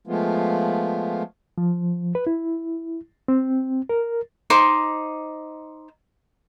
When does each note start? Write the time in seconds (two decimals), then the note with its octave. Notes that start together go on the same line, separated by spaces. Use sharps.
0.07 F3 G#3 A3 B3 F4
1.58 F3
2.15 B4
2.27 E4
3.28 C4
3.89 A#4
4.50 D#4 C5 D6